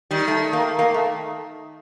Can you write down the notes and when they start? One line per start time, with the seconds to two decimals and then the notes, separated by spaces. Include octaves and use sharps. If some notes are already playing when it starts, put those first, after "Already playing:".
0.11 D#3 G3
0.28 A3
0.53 A#3
0.79 A#3
0.94 A3